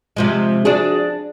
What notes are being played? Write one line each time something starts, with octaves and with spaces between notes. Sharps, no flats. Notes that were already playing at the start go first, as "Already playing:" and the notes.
C3 F3 G#3
D4 F#4 G#4